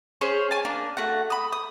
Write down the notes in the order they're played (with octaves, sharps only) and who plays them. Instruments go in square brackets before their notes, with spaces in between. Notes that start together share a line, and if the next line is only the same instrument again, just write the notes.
[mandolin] C#4 G#4 C5 C#5
G#5 A5
A#3 D4
A3 F#4 F#5
B5 D#6
D#6